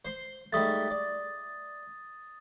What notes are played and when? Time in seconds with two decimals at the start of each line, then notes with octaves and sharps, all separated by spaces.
0.05 C5 C6
0.53 G#2 G3 A3 D#6 A6
0.91 D5